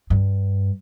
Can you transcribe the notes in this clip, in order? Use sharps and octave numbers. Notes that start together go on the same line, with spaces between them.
G2